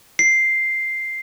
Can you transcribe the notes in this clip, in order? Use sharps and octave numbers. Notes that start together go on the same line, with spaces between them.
C7